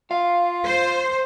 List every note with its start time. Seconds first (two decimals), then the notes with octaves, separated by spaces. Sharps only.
0.11 F4 F5
0.64 C5